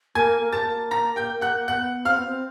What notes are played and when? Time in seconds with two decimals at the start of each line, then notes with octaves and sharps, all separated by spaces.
0.15 A#3 G#5 G#6
0.41 A#3
0.53 A5 A6
0.66 A#3
0.91 A#5 A#6
1.16 G5 G6
1.41 F#5 F#6
1.68 B3 F#5 F#6
2.05 C4 F5 F6
2.16 B3
2.25 C4